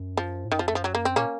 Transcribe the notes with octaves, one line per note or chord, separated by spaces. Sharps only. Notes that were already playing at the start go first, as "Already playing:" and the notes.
Already playing: F#2
F3
A2
F#2 D#3
F3
F2
A3
F#2 F3
F#3
A#3
C4
A#2 A#3 C#4